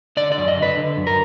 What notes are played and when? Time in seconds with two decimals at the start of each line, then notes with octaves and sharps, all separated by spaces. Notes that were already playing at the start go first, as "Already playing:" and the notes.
0.17 D3 D5
0.32 D5
0.38 F#2
0.48 D#5
0.57 D3 B4
0.77 D3
0.97 F#2
1.07 A#4